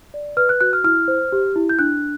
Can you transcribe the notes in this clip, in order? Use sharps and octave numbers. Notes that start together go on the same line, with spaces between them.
D5
B4 F6
F#6
F#4 F#6
F6
E4 F6
C5
G4
E4
G6
D4 F#6